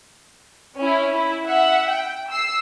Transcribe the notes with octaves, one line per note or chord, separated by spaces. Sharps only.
C#4 E4
E4
E5 F#5
G5
E6 C7